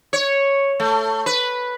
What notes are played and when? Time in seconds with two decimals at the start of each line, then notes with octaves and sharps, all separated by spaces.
0.13 C#5
0.80 A3
1.26 B4